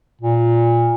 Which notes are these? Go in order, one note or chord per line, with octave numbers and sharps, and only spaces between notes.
A#2